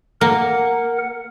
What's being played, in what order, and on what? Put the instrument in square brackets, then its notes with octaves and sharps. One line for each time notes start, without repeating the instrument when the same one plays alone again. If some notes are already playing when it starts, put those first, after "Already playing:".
[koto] A#3 [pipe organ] A#4 F#5